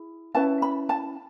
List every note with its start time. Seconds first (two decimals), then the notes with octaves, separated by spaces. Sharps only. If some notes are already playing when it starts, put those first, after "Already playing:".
Already playing: E4 G#4
0.35 C#4 E4 B4 A5
0.62 B5
0.89 A5